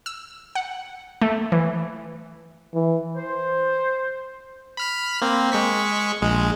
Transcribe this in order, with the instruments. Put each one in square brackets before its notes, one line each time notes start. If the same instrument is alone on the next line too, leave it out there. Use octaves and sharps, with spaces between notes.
[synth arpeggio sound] E6
F#5
A3
E3
[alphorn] E3
[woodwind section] C5
[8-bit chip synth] B5 F6 B6
A#3 C4
G#3 C#6 B6
A#1 G#3